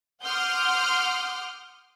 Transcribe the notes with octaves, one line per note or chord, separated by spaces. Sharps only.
F#5 C6 D6 D#6 F6 G6